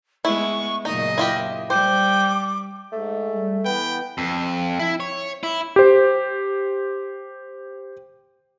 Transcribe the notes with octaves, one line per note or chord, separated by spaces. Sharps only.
G#3 B3 E4 C#6
F#2 A#2 C#3 D#4 D#5
E4 F4 G4
G3 C5 G5 D6
G#2 A3
G3
E3 B3 B4 G5
F2
E4
C#5
E4
G4 C5